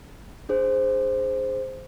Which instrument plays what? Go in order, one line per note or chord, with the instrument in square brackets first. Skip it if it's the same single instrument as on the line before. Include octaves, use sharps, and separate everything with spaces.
[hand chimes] D4 G#4 C5